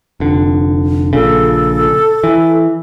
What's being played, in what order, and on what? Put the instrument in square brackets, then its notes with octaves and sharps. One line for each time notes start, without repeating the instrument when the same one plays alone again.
[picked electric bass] F1 D3
[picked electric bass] A#1 A#2 C#3 [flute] A4
[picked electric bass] E3